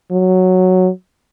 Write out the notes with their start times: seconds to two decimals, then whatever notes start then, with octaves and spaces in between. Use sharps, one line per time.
0.11 F#3